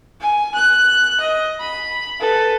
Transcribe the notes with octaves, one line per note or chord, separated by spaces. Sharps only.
G#5
F#6
D#5
B5
A4 B4